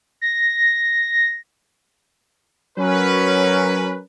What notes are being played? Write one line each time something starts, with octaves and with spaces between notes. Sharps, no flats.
A#6
F#3 C#4 A#4 B4